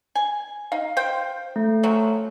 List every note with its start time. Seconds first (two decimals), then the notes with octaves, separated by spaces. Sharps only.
0.15 G#5
0.72 D#4 F5
0.97 C5 F5 G5
1.56 A3
1.83 C#3 F3 F#3